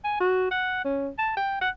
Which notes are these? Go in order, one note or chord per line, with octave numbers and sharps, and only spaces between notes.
G#5
F#4
F#5
C#4
A5
G5
F#5